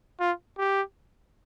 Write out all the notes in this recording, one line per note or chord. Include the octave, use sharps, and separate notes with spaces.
F4
G4